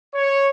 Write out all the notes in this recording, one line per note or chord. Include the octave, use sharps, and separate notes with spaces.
C#5